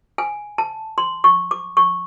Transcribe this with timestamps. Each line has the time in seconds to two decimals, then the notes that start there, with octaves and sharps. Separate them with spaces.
0.18 G#5
0.58 A5
0.98 C6
1.24 C#6
1.51 D6
1.77 C#6